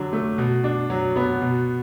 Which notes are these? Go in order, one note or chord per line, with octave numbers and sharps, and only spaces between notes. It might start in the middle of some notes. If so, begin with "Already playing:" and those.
Already playing: D3 F#3 D4
A3
B2
D4
F#3
B3
B2